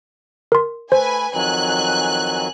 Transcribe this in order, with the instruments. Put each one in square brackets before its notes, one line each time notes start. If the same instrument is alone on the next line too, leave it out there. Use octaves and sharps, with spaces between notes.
[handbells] A#4 C6
[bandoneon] A3 [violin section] B4 G#5 [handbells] C5
[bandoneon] F2 D#3 F#3 [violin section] G#5 F#6